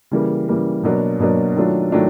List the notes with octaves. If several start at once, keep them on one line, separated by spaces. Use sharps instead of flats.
C#3 E3 G3 A#3
C#3 E3 G3 A#3
B2 F#3 A#3 D4
B2 F#3 A#3 D4
D#3 F#3 A3 D4 F4
D#3 F#3 A3 D4 F4